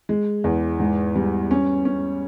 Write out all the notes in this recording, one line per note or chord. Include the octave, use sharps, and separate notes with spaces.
G#3
E2
G#2
G3
C#4
C#4